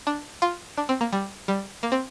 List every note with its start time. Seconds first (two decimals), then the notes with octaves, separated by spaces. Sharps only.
0.07 D4
0.42 F4
0.77 D4
0.89 C4
1.01 A#3
1.13 G3
1.48 G3
1.83 A#3
1.92 C4